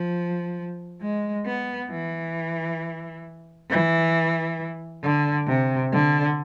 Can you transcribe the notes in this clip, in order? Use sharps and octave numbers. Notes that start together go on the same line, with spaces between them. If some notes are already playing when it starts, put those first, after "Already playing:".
Already playing: F3
G#3
B3
E3
E3
D3
C3
D3